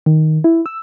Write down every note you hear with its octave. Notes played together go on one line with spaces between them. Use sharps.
D#3
E4
E6